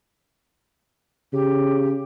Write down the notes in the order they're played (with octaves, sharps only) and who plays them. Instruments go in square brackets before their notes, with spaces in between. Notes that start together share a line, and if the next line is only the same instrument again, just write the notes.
[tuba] C#3 [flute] G4